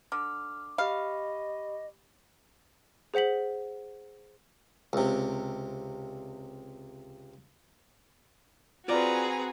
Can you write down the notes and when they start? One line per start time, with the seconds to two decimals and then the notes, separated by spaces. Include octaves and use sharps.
0.12 D3 D6 F6
0.78 G4 D#5 F5 B5
3.14 G#4 C5 F#5 B6 F#7
4.93 C#2 C3
8.88 C4 F4 F#4 G#4 B4 D5 A#5